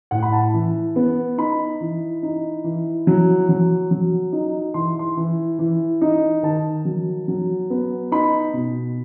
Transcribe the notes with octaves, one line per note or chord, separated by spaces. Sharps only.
A2 F#5
B5
A5
E3
B3
D#4 B5
E3
D#4
E3
F#3
F#3
F#3
D#4
E3 C6
C6
E3
E3
D#4
D#3 A5
F#3
F#3
B3
D#4 B5
B2